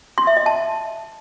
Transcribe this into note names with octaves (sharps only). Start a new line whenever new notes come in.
C6
E5
D#5
A5